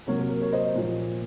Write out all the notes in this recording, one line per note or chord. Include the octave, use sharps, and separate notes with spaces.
C3 F#3 A#3 A#4 C#5
A#4
A#4
A#4 C#5
C5 D#5
A#2 F3 A#3